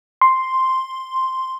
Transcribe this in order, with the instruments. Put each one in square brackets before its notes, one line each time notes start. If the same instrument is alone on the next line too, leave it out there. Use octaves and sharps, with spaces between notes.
[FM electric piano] C6